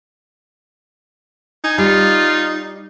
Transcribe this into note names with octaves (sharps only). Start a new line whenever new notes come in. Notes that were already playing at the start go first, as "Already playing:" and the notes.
D#4 G#5
G3 F4